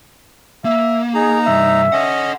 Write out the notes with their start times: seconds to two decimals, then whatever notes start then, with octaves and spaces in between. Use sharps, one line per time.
0.65 A#3 E5
1.15 D#4 G#4 A#5
1.47 C2 G2 E5
1.92 C#4 A4 D#5 F#5